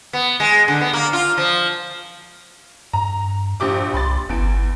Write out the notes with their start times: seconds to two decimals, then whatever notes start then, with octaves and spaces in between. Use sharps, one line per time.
0.13 B3
0.40 G#3
0.68 D3
0.81 B3
0.93 A#3
1.13 F4
1.38 F3
2.93 G2 A#5
3.60 A#1 G4 D6
3.94 C2 B5 C6 A6
4.29 G1 E2 D7